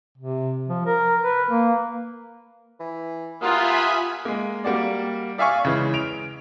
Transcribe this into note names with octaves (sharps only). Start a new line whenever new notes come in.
C3
F3
A#4
B4
A#3
E3
F4 G4 A#4 E5 F#5 G#5 B5 D#6
G#3 A#3
G3 A#3 F#4 D5
D5 E5 F5 G#5 C#6
C#3 E3 G#3
D7 F7